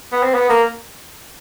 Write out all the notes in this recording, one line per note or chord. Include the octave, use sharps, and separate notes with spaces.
B3
C4
B3
A#3